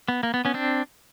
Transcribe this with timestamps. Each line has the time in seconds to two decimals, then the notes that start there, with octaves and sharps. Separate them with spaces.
0.08 B3
0.23 A#3
0.34 B3
0.45 B3 C#4
0.54 C4 D4